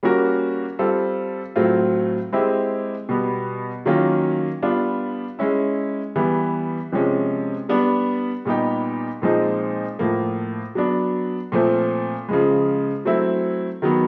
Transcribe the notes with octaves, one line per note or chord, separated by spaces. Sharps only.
G3 A#3 C#4 F#4 A#4
G3 C4 F4 A4
A2 F#3 A3 C4 F4
G#3 C4 E4 G4
B2 G3 B3
D#3 F#3 A#3 C#4 F4
G3 B3 D4 F4
G#3 C#4 E4
E3 G3 B3
C3 F3 G#3 C#4
G3 B3 D4
A#2 G3 B3 D#4 G4
A#2 F3 G#3 C4 D#4
A2 F3 A#3
F#3 B3 D4
A#2 F3 A3 C4
C#3 F3 G#3
F#3 A3 C4 E4
D#3 F#3 B3